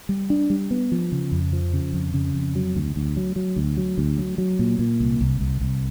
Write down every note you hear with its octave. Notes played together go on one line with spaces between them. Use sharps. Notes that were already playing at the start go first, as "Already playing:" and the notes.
G3
D4
G3
B3
F3
C#3
F2
F3
C#3
F2
C#3
F2
F#3
D2
D2
F#3
F#3
D2
F#3
D2
F#3
F#3
A#2
A#2
C2
C2
C2
C2